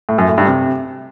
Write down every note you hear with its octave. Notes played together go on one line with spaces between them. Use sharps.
A2
F#2
A2
G2
C3